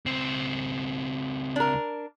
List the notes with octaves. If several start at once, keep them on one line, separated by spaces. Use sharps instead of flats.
C#2 C4
D4 A#4